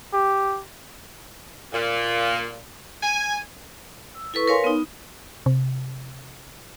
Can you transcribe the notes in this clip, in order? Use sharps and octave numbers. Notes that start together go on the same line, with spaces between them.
G4
A#2
G#5
E6
E4 A4 B4 C#6
A#4 B4 C#5 F5 G#5 C6
B3 D#4
C3